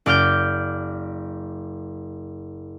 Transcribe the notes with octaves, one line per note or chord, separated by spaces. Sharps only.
F#1 D5 D6 F6 G6 D7